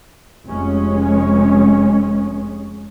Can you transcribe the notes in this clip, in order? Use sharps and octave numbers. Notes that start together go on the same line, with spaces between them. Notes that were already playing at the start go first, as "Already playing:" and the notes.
F1 G#3 C#4